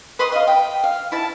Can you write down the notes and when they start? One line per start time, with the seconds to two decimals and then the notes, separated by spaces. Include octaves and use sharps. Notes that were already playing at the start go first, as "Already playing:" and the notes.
0.19 B4 B5 C6 D#6
0.32 D#5 F5
0.47 G5
0.84 F5
1.12 E4 A5